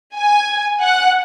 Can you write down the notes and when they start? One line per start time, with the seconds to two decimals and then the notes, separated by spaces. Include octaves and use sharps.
0.16 G#5
0.82 F#5